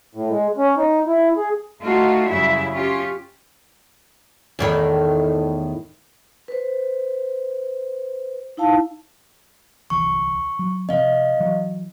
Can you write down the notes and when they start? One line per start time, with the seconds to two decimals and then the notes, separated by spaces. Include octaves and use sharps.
0.15 A2
0.30 G#3
0.58 C#4
0.77 D#4
1.07 E4
1.37 G#4
1.82 A3 D#4 F4 F#4
2.29 F#2 C#3 G3 E4 E5
2.73 C#4 F4 G4
4.59 E2 A2 D#3
6.48 B4 C5
8.57 D#4 E4 F5 A5
9.90 D1 C2 E3 C#6
10.59 F#3
10.89 C3 F3 C4 D#5 F5
11.40 E3 F#3